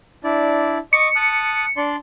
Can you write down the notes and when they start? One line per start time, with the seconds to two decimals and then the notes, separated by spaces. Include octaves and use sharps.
0.24 D4 E4 D5
0.93 D#5 C#6 D6 C#7
1.16 A5 D#6 F#6
1.77 D4 D5 C6